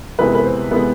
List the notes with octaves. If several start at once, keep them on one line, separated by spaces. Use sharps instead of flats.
F2 C3 E3 G#3 B3 B4
B4
C5
C3 E3 G#3 B3